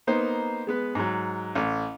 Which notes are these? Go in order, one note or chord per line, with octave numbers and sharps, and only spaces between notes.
A#3 B3 D#4 C5
G#3 B3 B4
G#2 F#3
A1